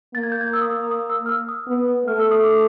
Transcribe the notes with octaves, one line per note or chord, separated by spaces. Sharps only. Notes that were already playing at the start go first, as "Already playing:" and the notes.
A#3 A6
G#6
G6
G#6
E6
D#6
E6
D#6
E6
F6
E6
D#6
B3
A3 F6
E6
D#6
D6